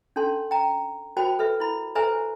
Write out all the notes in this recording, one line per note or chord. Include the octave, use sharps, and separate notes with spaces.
C#4 D4 A4 A5 C6
G5 A#5
F#4 A#4 C5 G5 A5 B5
A4 B4 E5
E4 B5
A4 B4 C5 E5 G#5 A#5